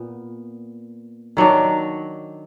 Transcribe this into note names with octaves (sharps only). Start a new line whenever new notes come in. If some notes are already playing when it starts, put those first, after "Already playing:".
Already playing: A#2 B3
D#3 F#3 D4